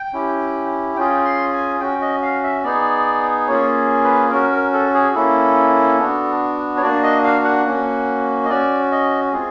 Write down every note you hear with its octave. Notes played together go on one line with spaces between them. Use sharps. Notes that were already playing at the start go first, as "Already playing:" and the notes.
Already playing: G5
C#4 E4 G4
C#4 F4 G#4 G5
C6
G#5
C#4 F#4 G5
D#5
F5
E5
B3 D#4 G#4 D5
A#3 C#4 F4 G#4 C#5
B4
C#4 F#4 A#4
A#4
A4
G#4
A#3 C#4 E4 A4
B3 D4 F#4
C#5
A#3 D4 F#4 D5
D#5
F5
F#5
A#3 C#4 F#4
D#5
C#4 F#4 D5
D#5
G#3 C4 F4 G#4